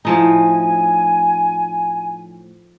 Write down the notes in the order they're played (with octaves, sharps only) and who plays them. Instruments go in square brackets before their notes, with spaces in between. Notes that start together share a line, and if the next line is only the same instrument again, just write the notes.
[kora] A2 F3 D#4 [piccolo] G#5